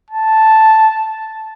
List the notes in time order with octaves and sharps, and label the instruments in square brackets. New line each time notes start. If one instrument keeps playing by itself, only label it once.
[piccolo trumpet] A5